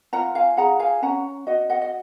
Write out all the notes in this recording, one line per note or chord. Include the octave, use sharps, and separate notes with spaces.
F4 F#5 A#5
F5 G#5
G#4 F#5 A#5
F5 G#5
C#4 F#5 A#5
F#4 D#5 F#5
D#5 F#5
D#5